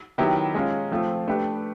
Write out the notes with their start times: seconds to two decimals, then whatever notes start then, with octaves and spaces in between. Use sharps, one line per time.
0.18 D#3 F#3 B3 E4 G4
0.55 G#3 C#4 F4
0.91 F3 A3 C4 F4
1.27 A3 D4 G4 B4